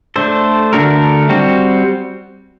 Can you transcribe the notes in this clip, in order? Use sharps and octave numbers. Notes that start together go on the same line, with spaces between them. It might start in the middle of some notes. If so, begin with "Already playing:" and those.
A3 D4 A4 C5
D3 A3 D4 F#4 A#4
G3 C4 F#4